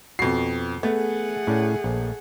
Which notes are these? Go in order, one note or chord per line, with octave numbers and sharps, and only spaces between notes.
F2 B2 F#4 C7
A3 B3 G#4 F#5
A2 C#4 D5
A#1